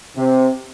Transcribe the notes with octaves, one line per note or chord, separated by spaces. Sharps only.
C3